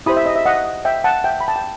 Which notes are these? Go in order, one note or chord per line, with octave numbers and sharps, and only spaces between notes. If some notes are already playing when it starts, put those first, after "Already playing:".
E4 G4 C5 B5 D#6
E5
D#5
E5
D#5 F#5
E5 G5
F#5 A5
E5 G5
B5
A5
G5